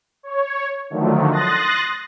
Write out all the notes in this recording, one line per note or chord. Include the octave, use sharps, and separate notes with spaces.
C#5
D3 D#3 F3 F#3 A3
C6 D#6 F#6 A6 A#6